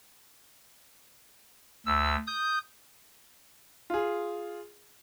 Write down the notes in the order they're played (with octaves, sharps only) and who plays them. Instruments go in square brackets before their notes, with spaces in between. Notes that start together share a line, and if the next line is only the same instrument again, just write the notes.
[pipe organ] D2 E6
D#6 G6
[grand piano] F4 G#4